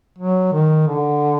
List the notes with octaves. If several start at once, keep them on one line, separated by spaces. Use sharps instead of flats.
F#3
D#3
D3